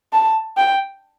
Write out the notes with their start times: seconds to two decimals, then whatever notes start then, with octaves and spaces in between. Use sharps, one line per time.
0.13 A5
0.57 G5